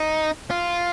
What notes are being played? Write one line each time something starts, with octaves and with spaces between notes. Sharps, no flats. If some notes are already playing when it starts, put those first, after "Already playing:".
Already playing: D#4
F4